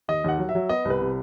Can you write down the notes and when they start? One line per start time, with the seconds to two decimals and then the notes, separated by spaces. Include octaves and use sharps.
0.08 D#2 D#5
0.24 D#2 F#5
0.38 F#3
0.49 E5
0.55 F#3
0.69 B3 D#5
0.85 C2
0.90 B4
1.01 C3